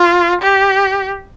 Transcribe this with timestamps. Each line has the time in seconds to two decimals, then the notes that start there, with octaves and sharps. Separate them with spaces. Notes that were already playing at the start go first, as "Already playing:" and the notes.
Already playing: F4
0.41 G4